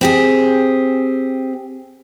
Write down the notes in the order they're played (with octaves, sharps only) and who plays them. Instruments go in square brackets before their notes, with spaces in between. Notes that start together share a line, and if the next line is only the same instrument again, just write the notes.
[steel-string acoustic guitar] C4 G4 G#4